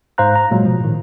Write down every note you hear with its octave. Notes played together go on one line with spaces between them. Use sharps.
G#2 C5 F5 A#5 F#6
A#5
A#2 F#3 G#3
B2 F3
A2 D#3